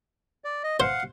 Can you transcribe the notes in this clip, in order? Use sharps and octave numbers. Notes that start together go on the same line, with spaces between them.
D5
D#5
C5 F5 F#5